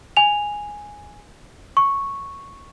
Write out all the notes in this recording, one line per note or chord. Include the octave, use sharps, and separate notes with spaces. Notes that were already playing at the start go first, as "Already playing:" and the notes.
G#5 F7
C#6